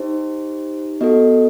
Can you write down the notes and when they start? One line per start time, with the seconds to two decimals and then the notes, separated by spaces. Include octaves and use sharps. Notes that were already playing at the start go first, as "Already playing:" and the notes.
Already playing: D#4 G4 C5
1.01 B3 F#4 A4 D#5